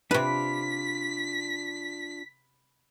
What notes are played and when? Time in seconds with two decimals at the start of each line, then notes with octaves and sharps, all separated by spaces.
0.11 C3 D4 F4 B4 B5 D6 B6